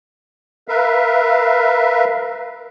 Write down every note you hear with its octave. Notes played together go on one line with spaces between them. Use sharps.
A#4 B4 E5 F5